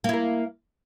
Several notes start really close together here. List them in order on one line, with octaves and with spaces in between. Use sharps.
A#3 E4 A#4